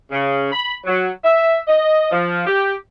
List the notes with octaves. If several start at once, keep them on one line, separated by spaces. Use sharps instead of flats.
C#3
B5
F#3
E5
D#5
F3
G4